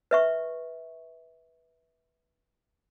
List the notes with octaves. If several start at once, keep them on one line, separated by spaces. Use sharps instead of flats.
B4 E5 C#6